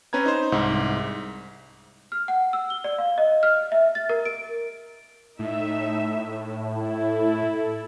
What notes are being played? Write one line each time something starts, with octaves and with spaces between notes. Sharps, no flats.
C4 C#4 B4 A#5 G#6
D#4 C5
C2 G#2
F6
F#5
E6
G7
D5
F5
D#5
F6
E5
A6
A#4
D7
A2 D#4 E5
E4 A4